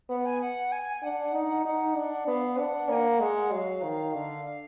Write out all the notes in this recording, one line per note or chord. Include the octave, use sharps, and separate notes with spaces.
B3 F#5
G#5
F#5
G#5
D4 F#5
D#4
D#4 F#5
D4
B3 F5
D4 F#5
A#3 F#5 G#5
G#3 F#5
F#3 F5
D#3
D3 F5
F5